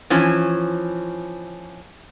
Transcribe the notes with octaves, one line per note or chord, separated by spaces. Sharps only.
E3 F3 C#4